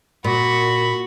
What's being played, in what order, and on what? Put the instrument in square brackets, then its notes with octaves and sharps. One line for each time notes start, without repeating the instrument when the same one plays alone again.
[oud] A#2 [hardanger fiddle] F#4 [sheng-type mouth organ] B5